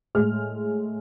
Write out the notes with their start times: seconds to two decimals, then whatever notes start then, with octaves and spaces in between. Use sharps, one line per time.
0.15 A2 G#3 F6